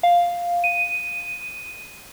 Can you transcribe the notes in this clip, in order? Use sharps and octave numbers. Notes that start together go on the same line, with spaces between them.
F5
D#7